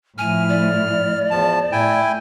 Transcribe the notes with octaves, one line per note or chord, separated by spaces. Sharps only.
A2 F3 E4 G#5 F6
D5
E2 F3 A5
A2 E4 G5 G#5